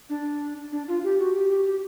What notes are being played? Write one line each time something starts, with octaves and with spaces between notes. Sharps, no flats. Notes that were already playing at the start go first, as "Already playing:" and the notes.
D4
D4
F4
G4
F#4
G4
G4
G4